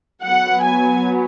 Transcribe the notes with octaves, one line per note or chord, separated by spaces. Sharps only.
F#3 B3 F#5
G#5